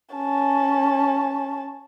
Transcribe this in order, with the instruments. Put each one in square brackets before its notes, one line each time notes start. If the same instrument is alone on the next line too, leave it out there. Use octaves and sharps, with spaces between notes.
[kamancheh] C#4 A5